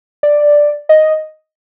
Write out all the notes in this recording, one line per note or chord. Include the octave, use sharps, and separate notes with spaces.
D5
D#5